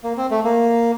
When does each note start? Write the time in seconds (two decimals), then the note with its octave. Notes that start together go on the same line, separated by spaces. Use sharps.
0.04 A#3
0.17 C4
0.31 A3
0.44 A#3